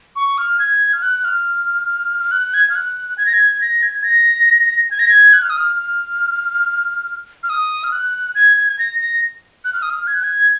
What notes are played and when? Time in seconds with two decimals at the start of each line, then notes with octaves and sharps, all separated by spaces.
0.16 C#6
0.38 F6
0.59 G#6
0.93 F6
1.02 F#6
1.25 F6
2.19 F6
2.31 F#6
2.54 G#6
2.70 F6
2.75 F#6
3.18 G#6
3.26 A#6
3.33 G#6
3.61 A#6
3.82 G#6
4.04 A#6
4.91 G#6
4.99 A#6
5.09 G#6
5.33 F#6
5.42 F6
5.50 D#6
5.57 F6
5.76 F6
7.43 F6
7.49 D#6
7.84 F6
7.92 F#6
8.35 G#6
8.57 G#6
8.67 G#6
8.79 A#6
9.00 A#6
9.65 F#6
9.73 F6
9.82 D#6
9.90 F6
10.07 G#6
10.15 F#6
10.23 G#6